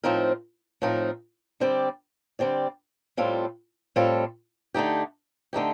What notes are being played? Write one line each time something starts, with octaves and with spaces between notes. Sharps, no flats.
A2 F3 C4 D#4 A#4
A2 F3 C4 D#4 A#4
D3 G3 C4 G4 D5
D3 G3 C4 G4 D5
A2 G3 C4 F4 A4
A2 G3 C4 F4 A4
D3 A3 D#4 G4
D3 A3 D#4 G4